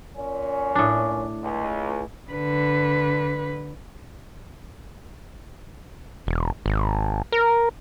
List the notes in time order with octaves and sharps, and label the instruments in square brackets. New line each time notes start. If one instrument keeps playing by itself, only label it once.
[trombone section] A#2 C#4
[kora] A2 D4
[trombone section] C#2
[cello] D3 B4
[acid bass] E1
G#1
A#4